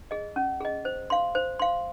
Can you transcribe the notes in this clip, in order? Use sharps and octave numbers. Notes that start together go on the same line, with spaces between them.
G#4 D#5
C#4
G#4 D#5
C5
F5 C6
C5
F5 C6